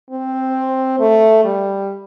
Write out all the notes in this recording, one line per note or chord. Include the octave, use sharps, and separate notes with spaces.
C4
A3
G3